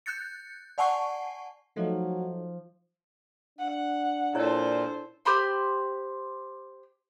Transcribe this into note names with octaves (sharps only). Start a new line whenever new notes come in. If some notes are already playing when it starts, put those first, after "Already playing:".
F#6 G6 A6 C#7
D5 F#5 G#5 A5 C#6 C7
F3 F#3 A3 D#4
D4 F#5
A#2 E4 A4 C5 C#5
G4 C5 B5 C6